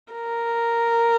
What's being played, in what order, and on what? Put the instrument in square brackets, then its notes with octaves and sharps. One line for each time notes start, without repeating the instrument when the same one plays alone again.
[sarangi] A#4